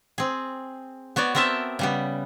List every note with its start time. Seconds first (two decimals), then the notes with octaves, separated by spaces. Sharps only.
0.18 C4 G#4
1.16 B3 F#4 C#5 D5
1.35 B3 C4 A#4 C5 E5 A5
1.79 C#3 G3 B3